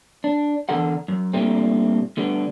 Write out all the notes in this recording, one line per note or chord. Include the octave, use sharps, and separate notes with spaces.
D4
E2 D3 D4 A4 A#4 F#5
F#2
A#2 D3 G3 A3 C4
D2 D3 G3 B3